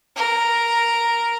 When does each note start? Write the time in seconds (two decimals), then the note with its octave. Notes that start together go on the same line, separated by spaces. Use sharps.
0.16 A#4